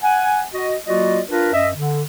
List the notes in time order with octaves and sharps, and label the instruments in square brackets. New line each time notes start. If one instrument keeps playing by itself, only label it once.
[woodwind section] F#5 G#5
F#4 D#5
F#3 A#3 F4 F#4 D5 D#5
D4 F4 A#4 B4
F#2 D#5 E5
D3